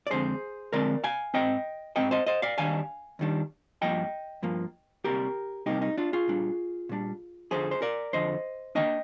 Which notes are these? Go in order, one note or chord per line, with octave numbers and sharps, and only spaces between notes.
D5
F2 D3 G#3 C4 G#4 C5
F2 D3 G#3 C4 A#4 D5
F5 G#5
G#2 F3 C4 D#5 G5
G#2 F3 C4 D#5 G5
C5 D#5
C5 D#5
D5 F5
D#2 D#3 G3 D4 F5 G#5
D#2 D#3 G3 D4
G2 F3 A#3 D#5 G5
G2 F3 A#3
C2 C3 G3 A#3 G4 A#4
C2 C3 G3 A#3 D#4 G4
D#4
D4 F4
F4 G#4
A#2 G3 D4
A#2 G3 D4
F2 D3 F3 G#4 C5
C5
A#4 D5
F2 D3 F3 C5 D#5
D#3 A#3 D4 D#5 G5